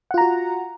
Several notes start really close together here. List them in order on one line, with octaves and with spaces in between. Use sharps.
F#5 F4 A#5 F#4